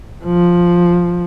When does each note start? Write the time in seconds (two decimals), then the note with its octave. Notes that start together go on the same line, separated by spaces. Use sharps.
0.25 F3